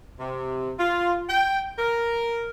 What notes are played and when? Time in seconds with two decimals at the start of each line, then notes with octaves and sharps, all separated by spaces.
0.20 C3
0.79 F4
1.28 G5
1.79 A#4